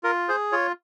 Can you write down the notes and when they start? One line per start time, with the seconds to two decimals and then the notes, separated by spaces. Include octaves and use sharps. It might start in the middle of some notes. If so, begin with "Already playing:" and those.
0.03 F4 A#4
0.29 G#4 C5
0.52 F4 C#5